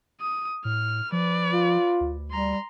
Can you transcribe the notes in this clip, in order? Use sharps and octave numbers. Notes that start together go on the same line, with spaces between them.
D#6
A2 F6
F3 B4 D5
F4
D2
G3 A#5 C6